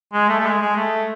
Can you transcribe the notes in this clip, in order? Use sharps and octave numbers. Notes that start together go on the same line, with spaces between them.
G#3
A3
A3
G#3
G#3
A3